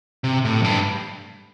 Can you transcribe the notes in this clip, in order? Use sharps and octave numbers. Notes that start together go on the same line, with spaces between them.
C3
A2
F2
G2